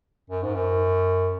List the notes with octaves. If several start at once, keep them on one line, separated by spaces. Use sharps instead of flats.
F#2
G#2
F#2